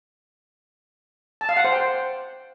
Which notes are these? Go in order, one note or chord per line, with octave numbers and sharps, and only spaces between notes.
A5
F5
F#5
C5
G5